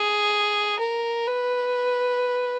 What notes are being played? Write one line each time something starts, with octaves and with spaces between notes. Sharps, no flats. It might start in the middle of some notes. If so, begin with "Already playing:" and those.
Already playing: G#4
A#4
B4